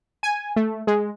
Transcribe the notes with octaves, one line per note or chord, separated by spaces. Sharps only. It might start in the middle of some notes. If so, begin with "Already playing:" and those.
G#5
A3
G#3